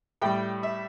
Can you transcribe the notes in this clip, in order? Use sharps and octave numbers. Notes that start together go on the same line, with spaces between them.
A2 G3 G5
E5